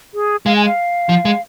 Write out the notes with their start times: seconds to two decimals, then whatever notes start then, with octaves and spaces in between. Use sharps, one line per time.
0.14 G#4
0.46 G#3 F5
0.56 G#5
0.66 F5
1.09 F3
1.25 G#3